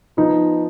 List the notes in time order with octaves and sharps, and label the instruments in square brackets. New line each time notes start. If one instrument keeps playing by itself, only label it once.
[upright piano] F3 B3 F4 [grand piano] D#4